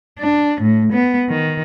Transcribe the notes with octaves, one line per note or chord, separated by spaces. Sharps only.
D4
A2
B3
D#3